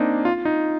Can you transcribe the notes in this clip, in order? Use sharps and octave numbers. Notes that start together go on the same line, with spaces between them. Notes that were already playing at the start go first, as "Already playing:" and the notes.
Already playing: A#3 C4 D4 D#4
F4
D#4